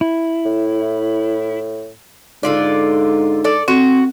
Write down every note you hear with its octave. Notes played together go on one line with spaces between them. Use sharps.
E4
A2
G#2 D3 F4 D5
A4 D5
C4 F#4